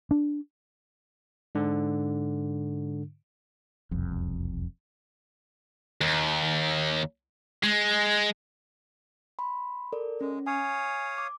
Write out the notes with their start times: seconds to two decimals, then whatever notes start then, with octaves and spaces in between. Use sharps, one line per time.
0.11 D4
1.55 G#2 D3
3.91 E1 C2 F2
6.01 D#2
7.64 G#3
9.39 B5 C6
9.92 A4 A#4 D5
10.21 G#3 C#4
10.47 C#5 F5 G#5 D#6
11.18 D6